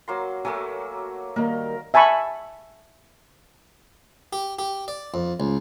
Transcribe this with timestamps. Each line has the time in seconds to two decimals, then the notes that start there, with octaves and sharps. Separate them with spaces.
0.08 F#3 A#3 C6
0.45 F#3 A3 A#3 G#5
1.36 D#3 G3 A#3 A#4
1.94 E5 G#5 A5 B5 C#6
4.33 G4
4.59 G4
4.88 D5
5.14 F2
5.40 C#2